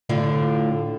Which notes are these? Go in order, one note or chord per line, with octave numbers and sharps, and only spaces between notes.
A2 D3 F4